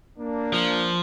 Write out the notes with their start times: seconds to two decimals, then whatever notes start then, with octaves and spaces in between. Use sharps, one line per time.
0.18 A#3 D4
0.53 F3